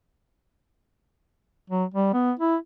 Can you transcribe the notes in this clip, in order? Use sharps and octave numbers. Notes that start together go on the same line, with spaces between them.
F#3
G3
B3
E4